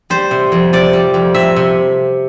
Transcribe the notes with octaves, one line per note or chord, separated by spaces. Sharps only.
G3 C5
C3
F2
C3 D5
G3
F2
C3 E5
C3